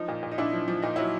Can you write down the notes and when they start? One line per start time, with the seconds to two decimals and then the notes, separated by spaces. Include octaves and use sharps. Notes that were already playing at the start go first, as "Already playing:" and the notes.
Already playing: F3 D#4
0.08 A#2
0.23 A#2
0.31 D#4
0.38 A#2 D4 E4
0.53 F3
0.68 F3
0.82 A#2 D#4
0.96 F#3 E4